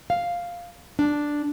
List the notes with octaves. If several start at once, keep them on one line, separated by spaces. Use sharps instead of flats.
F5
D4